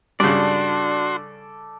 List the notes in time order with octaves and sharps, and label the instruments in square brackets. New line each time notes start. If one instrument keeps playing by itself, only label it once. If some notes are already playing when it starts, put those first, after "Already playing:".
[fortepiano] G2 C#3 [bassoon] D4 [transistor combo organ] F#4 C6 [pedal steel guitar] A4 D5